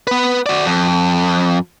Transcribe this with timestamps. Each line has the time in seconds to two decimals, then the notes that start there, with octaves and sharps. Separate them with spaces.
0.07 B3 B4
0.46 F#4 D5
0.65 F2